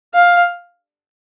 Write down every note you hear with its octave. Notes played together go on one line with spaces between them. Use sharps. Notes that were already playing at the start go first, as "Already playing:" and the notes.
F5